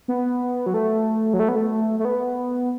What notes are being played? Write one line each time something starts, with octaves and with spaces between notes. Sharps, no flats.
B3
F#3
A3
F#3
A3
B3
A3
A3
B3